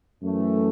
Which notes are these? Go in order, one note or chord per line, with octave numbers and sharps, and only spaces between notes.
F#2 E3 A3